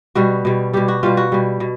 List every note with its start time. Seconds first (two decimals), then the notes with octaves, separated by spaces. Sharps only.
0.15 B2 G3 F#4
0.45 B2 G3
0.73 B2 G3 G4
0.88 F#4
1.03 B2 G3 F4
1.17 F#4
1.32 B2 G3
1.60 B2